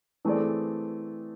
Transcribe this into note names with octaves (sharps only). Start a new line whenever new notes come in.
E3 A3 C4 G#4 D5